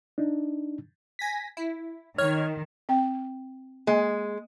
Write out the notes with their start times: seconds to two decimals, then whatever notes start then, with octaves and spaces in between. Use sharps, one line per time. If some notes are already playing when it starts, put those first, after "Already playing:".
0.18 D4 D#4
1.19 G#5 A#6 B6
1.57 E4
2.18 D#3 C#5 F6 G#6
2.89 C4 G5
3.87 G#3 A#3